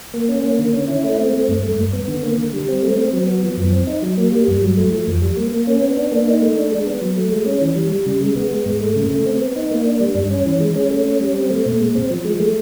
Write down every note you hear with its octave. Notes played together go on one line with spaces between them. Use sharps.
A#3
C#4
A#3
D3
C#4
E4
A3
C4
A3
G2
A3
G2
B3
D3
A#3
D3
G3
C4
A3
C4
F#3
B3
F3
F#2
C4
D#4
F#3
A#3
G3
G2
F#3
A3
F3
F2
G3
A#3
A#3
C#4
B3
D4
A#3
D#4
A3
D4
G#3
B3
F#3
A3
G#3
C#4
E3
G3
G3
C#3
G#3
B3
G#3
G#2
A3
C#3
A3
C4
B3
D#4
A#3
D4
G3
G2
C#4
E3
G#3
C#4
A3
C#4
G3
C4
A3
A#2
G#3
C4
F3
G#3
A3